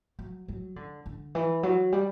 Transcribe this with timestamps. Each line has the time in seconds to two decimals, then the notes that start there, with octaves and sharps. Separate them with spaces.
0.19 F#3
0.48 F#3
0.76 D3
1.06 D3
1.35 E3
1.63 F#3
1.92 G3